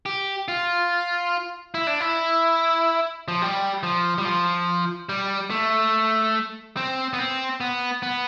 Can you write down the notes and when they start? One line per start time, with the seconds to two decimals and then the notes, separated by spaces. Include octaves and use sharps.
0.06 G4
0.48 F4
1.74 E4
1.87 D4
2.00 E4
3.28 F3
3.42 G3
3.83 F3
4.18 G3
4.25 F3
5.09 G3
5.50 A3
6.77 C4
7.13 B3
7.19 C4
7.60 B3
8.03 B3